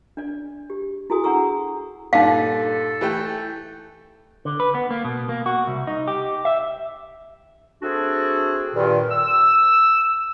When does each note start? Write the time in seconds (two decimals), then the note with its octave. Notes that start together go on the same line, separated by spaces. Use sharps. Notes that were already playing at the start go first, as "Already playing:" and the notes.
0.17 D4 D5
0.70 G4
1.10 E4 F#4 G#4 A4 G#5 D#6
1.24 D4 F#5 G#5 A#5 C#6 E6
2.13 G2 A#2 D#4 A4 F5
3.01 E3 A3 G5
4.45 D3
4.60 B4
4.75 B3
4.91 A#3
5.05 B2
5.29 A#3
5.46 F#4
5.67 C2
5.87 D#4
6.08 G4
6.45 E5
7.82 A3 C4 D4 F#4 G#4 A4
8.74 G2 A#2 D#3
9.10 E6